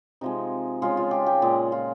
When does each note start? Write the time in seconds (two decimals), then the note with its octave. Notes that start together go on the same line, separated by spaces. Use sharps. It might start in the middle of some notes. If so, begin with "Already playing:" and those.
0.21 C3 F3 G#3 D#4
0.82 C#3 F3 G#3 F4
0.97 F4
1.11 G4
1.26 G4
1.42 A#2 G#3
1.72 F4